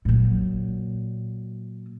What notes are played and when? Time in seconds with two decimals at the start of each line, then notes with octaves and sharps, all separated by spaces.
0.05 A#2 F#3